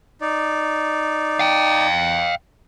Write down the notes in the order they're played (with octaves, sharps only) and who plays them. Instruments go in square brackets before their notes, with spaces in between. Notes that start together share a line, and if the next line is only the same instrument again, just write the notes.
[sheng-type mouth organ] D#4 D5
[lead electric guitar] F5 G5